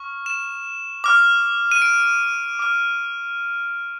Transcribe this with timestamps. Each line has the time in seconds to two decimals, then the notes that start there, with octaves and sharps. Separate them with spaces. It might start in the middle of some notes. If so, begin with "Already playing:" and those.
Already playing: C#6 F6
0.26 E7
1.04 D6 F6
1.72 D#7
1.82 D7
2.59 D6 F6